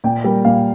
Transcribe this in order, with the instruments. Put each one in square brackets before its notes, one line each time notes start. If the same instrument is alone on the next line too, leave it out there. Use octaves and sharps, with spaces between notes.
[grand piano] A#2 G5
G3 A#3
A#2 F5